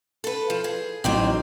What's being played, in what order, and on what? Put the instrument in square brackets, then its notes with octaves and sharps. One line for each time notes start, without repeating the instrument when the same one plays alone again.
[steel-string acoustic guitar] A4 B4
F3
G#4
[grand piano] A1 F#3 [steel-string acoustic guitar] D#3 C4 D#4